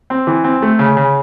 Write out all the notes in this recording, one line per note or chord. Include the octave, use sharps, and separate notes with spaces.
C4
E3
C4
A3
C#3
C#3